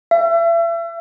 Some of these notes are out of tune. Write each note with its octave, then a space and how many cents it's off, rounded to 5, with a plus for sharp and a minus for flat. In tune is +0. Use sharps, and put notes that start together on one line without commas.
E5 +35